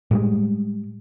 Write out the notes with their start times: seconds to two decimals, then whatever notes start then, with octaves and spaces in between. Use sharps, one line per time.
0.11 A2 G3 G#3